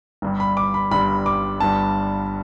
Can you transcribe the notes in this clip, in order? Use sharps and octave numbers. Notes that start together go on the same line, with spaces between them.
G1 G2 G3
B5
D6
B5
G1 G2 G3 B5
D6
G1 G2 G3 A5